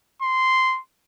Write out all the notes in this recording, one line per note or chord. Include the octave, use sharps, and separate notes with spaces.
C6